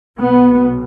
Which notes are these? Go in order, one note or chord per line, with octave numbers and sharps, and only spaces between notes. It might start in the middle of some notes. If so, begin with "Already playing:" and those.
B1 B2 B3